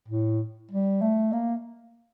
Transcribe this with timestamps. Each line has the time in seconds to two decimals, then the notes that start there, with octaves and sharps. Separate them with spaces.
0.08 A2
0.71 G3
1.01 A3
1.33 A#3